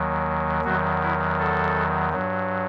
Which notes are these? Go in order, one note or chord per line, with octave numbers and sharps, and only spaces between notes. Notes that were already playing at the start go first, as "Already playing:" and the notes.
Already playing: D#2 D#3 F#3
E2 D#3 F#3 F#4
E4
A4
G2 F#3